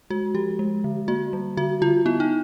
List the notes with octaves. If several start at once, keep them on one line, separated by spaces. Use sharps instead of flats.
G#3 F#4
F3 G4
G#3
D3
A#3 F#4
G3
D3 F#4
D3 F4
B3 E4
D#4